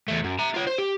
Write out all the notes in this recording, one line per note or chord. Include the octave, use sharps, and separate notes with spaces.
E2 A3
F#2
E5 A#5
F4 C#5
C5
G4